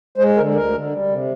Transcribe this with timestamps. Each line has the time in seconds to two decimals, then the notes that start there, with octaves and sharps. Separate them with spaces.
0.18 G#3 C5
0.36 D3 A#4
0.54 D2 A#4
0.72 D3
0.90 G3
1.09 C3